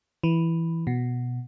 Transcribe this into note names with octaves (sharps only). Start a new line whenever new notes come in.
E3
B2